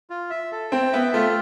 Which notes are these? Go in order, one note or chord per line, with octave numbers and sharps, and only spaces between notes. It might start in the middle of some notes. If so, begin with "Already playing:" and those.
F4
E5
A4
C4 G5
B3 E5
A3 F4